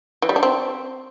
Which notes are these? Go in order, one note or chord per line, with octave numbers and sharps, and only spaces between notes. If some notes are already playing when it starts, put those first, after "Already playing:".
E3
G3
D4
C4